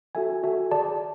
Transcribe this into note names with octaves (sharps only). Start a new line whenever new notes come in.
F#4 A4 E5 G#5
F#4 A4 E5 G#5
G#4 D5 A5